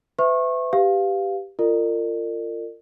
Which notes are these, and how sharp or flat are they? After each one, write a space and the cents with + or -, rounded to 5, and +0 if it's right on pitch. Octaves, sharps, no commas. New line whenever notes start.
B4 +40 E5 +0 C#6 -30
G4 +0 B4 +5 F5 +0
F4 -20 A#4 -40 D5 +45